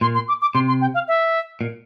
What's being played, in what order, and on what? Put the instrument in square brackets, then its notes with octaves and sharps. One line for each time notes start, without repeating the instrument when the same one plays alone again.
[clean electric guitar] A#2 [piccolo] C6
[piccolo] C6
D6
D6
[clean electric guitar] C3 [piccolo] C6
[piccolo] C6
G5
F5
E5
[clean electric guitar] A#2